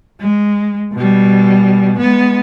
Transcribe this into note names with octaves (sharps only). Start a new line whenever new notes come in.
G#3
B2 G3
G#3 B3